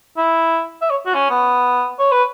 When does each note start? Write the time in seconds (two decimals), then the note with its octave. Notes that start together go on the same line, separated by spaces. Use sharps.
0.17 E4
0.82 E5
0.90 C#5
1.06 F#4
1.14 C#4
1.30 B3
1.99 C#5
2.12 B4